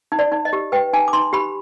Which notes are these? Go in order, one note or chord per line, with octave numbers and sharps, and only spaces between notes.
D#4
D5
D#4
D#5
G4
B4 G5
D#4 G#5
D6
D#4 C6
G4 B5